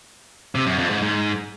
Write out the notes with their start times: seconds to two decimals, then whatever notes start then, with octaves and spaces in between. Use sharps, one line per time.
0.55 C3
0.67 F#2
0.79 F2
0.90 G#2
1.02 G#2